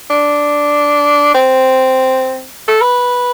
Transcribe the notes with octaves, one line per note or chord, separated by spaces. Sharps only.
D4
C4
A4
B4